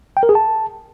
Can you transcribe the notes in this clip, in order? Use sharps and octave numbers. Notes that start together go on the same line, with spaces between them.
G5
A#4
G#4
A5